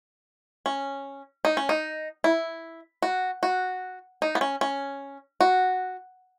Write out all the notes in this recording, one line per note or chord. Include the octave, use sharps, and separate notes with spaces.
C#4
D#4
C#4
D#4
E4
F#4
F#4
D#4
B3
C#4
C#4
F#4